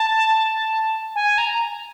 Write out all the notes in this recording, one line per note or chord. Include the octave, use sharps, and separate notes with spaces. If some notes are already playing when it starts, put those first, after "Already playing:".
Already playing: A5
G#5
A#5